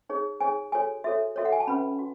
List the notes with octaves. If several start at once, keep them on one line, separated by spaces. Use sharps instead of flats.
D#4 G#4 C#5
D#4 G#4 C#5 G#5
F#4 A4 C#5 G#5
F#4 A4 C#5 E5
F#4 A4 C#5 E5
F#5
G#5
A5
C#4 F#4 B4 B5
F#4